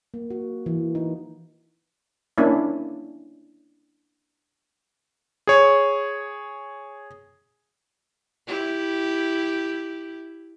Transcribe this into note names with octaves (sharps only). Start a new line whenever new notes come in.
A#3
F#4
E3
D#4
A#3 C#4 D4 E4
G#4 C#5
E4 G4